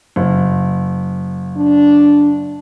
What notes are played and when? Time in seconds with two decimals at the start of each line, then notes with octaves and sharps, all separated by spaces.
0.16 F#1
1.57 D4